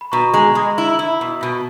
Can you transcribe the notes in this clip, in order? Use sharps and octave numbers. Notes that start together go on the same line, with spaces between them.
B5
B2 A#5 C#6
G#3 A#5 C#6
G#3 B5 D#6
E4
E4
B2
B2